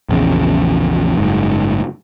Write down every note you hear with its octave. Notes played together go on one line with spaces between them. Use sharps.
A#1 E2 C#3
F#1 G#2